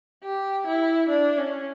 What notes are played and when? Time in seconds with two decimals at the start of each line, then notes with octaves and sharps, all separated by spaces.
0.24 G4
0.67 E4
1.09 D4
1.38 C#4